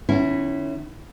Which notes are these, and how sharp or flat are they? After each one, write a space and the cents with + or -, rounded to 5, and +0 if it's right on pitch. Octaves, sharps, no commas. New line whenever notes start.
D#3 -45 C#4 +0 E4 +0